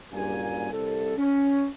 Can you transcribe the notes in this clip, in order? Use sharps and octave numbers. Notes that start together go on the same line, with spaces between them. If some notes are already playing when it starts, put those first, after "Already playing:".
F#1 G2 A#2 G#5
C2 A4
C#4